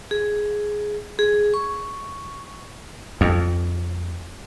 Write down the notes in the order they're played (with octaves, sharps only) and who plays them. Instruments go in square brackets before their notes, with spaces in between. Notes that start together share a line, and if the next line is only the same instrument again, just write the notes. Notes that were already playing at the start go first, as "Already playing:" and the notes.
[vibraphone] G#4
G#4
C#6
[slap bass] F2